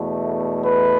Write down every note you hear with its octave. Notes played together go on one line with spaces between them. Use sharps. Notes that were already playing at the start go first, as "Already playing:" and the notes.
Already playing: E2 B2 A3
B4